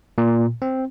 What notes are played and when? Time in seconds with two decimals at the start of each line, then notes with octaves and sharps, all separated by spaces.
0.18 A#2
0.62 C4